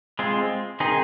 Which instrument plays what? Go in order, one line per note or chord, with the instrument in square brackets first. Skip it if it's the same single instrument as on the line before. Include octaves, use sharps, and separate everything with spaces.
[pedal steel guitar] G#3 C4 F4
D#3 C4 D#4 G#4